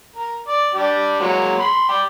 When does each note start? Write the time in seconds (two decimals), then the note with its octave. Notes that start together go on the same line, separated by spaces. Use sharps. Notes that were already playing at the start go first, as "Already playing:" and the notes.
0.16 A#4
0.48 D5
0.74 D4 G4 D5
1.20 F#3 G#3 A#3
1.59 B5 C6
1.89 D5 G5